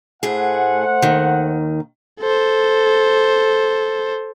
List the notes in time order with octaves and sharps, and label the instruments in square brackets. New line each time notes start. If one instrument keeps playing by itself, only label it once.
[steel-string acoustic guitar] A2 G#4 [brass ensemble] A3 C5 F#5
[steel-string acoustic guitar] D#2 D#3
[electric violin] A4 C5